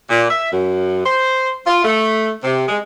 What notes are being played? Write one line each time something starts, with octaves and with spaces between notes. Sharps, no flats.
A#2
E5
F#2
C5
F4
A3
C3
G#3